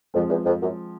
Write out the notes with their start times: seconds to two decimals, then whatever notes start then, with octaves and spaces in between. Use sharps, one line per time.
0.14 F2 F3 G#3 C4
0.30 E2
0.46 F2
0.61 F#2